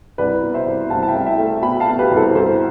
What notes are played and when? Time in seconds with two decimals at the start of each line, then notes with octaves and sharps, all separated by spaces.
0.18 C2 B4 D5
0.43 B2
0.54 C5 E5
0.66 C2
0.90 C2 F5 A5
1.03 A5
1.08 E5 G5
1.15 C2
1.26 E5 G5
1.38 A3
1.62 B2 G5 B5
1.80 F5 A5
1.87 B2
1.98 G4 B4
2.11 C2
2.16 A4 C5
2.35 C2 A4 C5